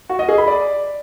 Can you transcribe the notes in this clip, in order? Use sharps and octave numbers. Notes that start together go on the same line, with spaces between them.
F#4
D#5
G#4
B5
D5